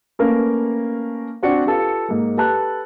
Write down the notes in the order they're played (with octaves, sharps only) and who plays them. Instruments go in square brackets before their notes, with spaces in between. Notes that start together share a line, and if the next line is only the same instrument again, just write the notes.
[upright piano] A3 A#3 C#4 A#4 B4 F5
C4 D4 F#4 C#7
F4 G4 A4 B4 F5
G#2 A#3
G4 A4 B4 A5 F#6